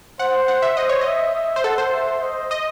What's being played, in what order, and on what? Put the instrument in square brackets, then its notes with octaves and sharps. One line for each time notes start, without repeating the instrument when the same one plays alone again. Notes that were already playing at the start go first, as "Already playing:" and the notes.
[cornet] C5 [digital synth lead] F#5
[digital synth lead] F#5
E5
[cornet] C5 [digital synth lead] D#5
[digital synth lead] C#5
[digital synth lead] D#5 [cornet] E5
[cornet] E5
[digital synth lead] C5
[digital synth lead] A4 [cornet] F#5
[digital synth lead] C5
[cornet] E5
D#5
[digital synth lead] D#5